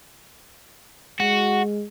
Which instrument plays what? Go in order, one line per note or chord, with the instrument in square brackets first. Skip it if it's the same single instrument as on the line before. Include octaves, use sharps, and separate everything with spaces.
[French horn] G#3 [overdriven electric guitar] F#4